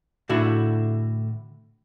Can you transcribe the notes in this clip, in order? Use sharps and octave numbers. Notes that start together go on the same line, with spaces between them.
A2 D3 E4 F#4